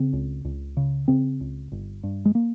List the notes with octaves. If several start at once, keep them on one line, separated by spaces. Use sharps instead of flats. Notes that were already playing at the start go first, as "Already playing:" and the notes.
Already playing: C#3 C4
C#2
C#2
C#3
C#3 C4
C#2
G1
G2
G#3
A#3